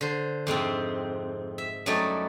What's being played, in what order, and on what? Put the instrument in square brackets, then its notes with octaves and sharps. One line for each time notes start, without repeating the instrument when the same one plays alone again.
[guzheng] D3 C5
F2 G#2 C3 C4
E5
F#2 F#3 G3 A3 D#4 D5